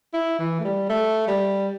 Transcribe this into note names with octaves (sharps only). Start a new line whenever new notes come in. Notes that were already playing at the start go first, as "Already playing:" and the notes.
E4
E3
A3
G3
A3
G3